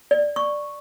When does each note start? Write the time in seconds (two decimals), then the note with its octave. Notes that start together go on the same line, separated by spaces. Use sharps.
0.11 D5
0.36 C#6